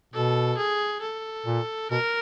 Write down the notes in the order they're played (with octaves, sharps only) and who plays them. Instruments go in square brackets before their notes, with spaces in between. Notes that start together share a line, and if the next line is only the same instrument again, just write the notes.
[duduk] B2 [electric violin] A4
[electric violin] G#4
A4
[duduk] A#2
[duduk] B2 [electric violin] A#4